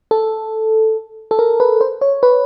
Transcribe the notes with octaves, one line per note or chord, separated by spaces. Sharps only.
A4
A4
A#4
B4
C5
C#5
B4